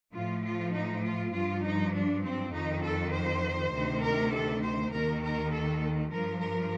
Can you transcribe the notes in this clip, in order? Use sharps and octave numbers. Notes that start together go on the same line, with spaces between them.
A2 F3 F4
F4
D#4
F4
G2 F3 F4
D#4
D4
C4
F2 D#3 D#4
A4
C5
D2 C3 D#3
A#4
A4
C5
D#2 D#3 A#4
A#4
A4
G2 F3 A#4
A#4